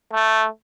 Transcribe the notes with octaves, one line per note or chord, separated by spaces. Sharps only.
A3